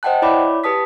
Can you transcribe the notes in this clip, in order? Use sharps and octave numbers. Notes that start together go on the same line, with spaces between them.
C5 D#5 F#5 G5 A5 F#6
E4 C#5 D5 E5 B5 D6
G4 B4 A5 D#6 B6